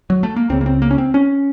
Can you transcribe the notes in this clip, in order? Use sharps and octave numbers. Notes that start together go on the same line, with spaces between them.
F#3
A3
A#3
C#2 C#3 C4
A#3
C4
A#3
C#4
C4
C#4